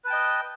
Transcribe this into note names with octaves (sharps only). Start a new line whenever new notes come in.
B4 D#5 G5 A5